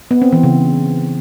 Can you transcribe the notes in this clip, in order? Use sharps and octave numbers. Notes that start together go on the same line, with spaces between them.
B3
C4
E3
C#3